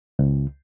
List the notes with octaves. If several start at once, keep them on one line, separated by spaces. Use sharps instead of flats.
C#2